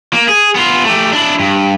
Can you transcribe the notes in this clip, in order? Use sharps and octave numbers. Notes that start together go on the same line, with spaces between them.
A#3
G#4
B3 F4
A3 G4
D4 E4
G2